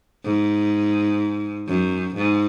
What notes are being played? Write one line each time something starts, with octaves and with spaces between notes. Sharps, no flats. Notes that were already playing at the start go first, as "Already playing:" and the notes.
G#2
F#2
G#2